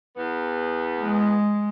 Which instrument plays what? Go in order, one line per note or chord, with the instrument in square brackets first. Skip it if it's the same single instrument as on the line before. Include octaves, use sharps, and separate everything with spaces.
[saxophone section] E2 B3
[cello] G#3